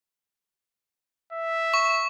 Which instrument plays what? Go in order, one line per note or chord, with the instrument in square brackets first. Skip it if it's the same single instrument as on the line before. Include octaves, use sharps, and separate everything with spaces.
[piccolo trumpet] E5
[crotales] C#6